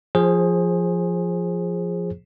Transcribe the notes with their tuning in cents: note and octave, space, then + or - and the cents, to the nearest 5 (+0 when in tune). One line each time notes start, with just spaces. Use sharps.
F3 +0 G#4 +0 C5 +25